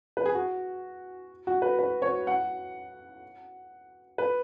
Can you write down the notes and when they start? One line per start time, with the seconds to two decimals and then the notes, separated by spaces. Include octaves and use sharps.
0.17 B4
0.26 G#4
0.35 F#4
1.47 F#4
1.62 B4
1.79 B4
2.02 C#5
2.27 F#5
4.18 B4